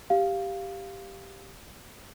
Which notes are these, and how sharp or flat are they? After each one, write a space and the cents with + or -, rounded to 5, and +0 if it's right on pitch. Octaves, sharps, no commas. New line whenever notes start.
G4 +0 F5 +0